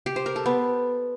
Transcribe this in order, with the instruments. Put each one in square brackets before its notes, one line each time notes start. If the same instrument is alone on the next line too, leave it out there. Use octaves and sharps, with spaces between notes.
[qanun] G4
C5
A#4
A4
B3